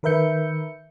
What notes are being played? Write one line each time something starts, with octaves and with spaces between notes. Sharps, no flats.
D#3 A#4 B4 E5 G6 C#7